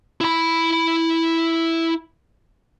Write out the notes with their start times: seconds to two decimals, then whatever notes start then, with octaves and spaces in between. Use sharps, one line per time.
0.21 E4 B5